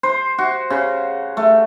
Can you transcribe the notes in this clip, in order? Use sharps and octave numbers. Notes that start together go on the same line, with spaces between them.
C5
F#4
C#3
A3